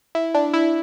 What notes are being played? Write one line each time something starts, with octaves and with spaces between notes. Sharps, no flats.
E4
D4
E4